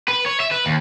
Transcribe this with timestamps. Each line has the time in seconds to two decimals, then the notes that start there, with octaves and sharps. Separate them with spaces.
0.08 B4
0.26 C#5
0.40 E5
0.51 B4
0.66 D#2